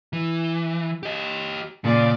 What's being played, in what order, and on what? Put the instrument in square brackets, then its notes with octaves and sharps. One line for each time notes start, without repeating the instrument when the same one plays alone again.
[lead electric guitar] E3
G4 D#5
[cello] A#2 D5 [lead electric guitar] C#3